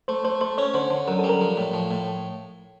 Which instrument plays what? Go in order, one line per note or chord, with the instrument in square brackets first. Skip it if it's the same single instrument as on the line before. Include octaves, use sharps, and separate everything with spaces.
[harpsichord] A3 [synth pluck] C5
[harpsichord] A3 [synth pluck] C5
[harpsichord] A3 [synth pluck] C5
[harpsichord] C#4 [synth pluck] C#5
[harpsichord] D3 [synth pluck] C5
[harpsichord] D3
[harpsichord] F#2 [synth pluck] A#4
[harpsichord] G3 [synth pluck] A4
[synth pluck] A#4
[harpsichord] F3
A2
F3
A2